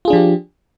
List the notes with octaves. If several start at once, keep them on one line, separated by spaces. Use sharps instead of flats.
F3 D4 F4 G4 G#4